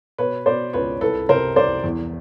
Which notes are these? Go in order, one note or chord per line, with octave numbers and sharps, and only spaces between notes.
B2 B4 C#5
B2 C5 D5
C#2 B4 C#5
C2 A4 B4
C3 A#4 C5
C2 C5 D5
E2